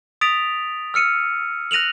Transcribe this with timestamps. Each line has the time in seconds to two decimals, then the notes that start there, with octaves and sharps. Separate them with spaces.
0.21 D#6 A6 B6 D7 F7
0.94 E6 F6 C#7 D#7
1.71 F#6 A#6 D#7 F7 F#7